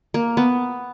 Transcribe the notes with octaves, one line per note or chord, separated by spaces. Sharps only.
A#3
B3